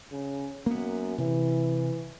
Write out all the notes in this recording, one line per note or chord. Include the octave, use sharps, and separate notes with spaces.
C#3
F#2 A#3 B3
C3 E3